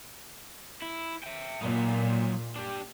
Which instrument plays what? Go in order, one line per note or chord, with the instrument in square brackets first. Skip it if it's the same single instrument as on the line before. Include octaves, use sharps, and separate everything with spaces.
[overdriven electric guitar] E4
E5 G5
[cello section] A#2 [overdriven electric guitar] F#3 D#4
[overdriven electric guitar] D4 G4